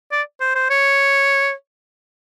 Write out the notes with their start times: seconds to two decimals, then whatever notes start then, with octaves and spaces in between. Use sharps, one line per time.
0.11 D5
0.40 C5
0.55 C5
0.70 C#5